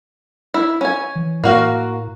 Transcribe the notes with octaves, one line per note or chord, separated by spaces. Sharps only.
E4
C#4 G#5
E3
A2 A#3 F#4 F5